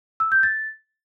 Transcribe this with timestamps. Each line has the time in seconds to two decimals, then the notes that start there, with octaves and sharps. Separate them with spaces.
0.20 E6
0.32 G6
0.43 A6